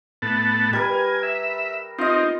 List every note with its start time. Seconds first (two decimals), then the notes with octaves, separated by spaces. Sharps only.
0.22 A2 B3 A5
0.73 G3 A#4 B4 G#5
1.23 E5
1.98 C4 D#4 F4 D#5